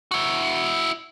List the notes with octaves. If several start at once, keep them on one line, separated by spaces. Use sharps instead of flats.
E4 F#4